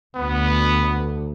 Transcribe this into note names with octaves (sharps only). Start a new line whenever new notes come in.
D2 B3